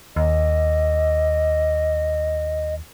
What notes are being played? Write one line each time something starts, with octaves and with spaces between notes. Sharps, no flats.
D#2 D#5